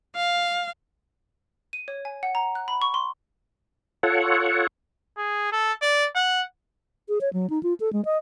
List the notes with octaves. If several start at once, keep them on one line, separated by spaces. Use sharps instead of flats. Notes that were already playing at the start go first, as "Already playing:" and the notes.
F5
D#7
C#5
G#5
F#5
A#5
F#6
B5
C#6
C6
F4 A4 C#5 F#5
G#4
A4
D5
F#5
G#4
C#5
F#3
D#4
F4
A4
G#3
D#5